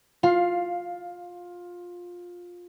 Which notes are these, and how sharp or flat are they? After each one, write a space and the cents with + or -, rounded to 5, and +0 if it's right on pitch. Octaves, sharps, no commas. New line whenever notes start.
F4 +15 F5 +0